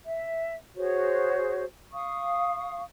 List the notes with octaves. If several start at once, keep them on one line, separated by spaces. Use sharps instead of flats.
E5
F#4 G#4 C5 C#5
F5 C#6 D#6